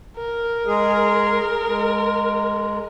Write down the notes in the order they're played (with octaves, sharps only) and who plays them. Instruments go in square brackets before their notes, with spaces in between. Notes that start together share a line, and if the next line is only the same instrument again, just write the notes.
[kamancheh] A#4
[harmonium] G#3 G#4
G#3